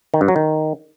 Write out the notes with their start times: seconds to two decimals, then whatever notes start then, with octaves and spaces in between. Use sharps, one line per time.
0.14 D#3
0.21 G2
0.28 F#3
0.36 D#3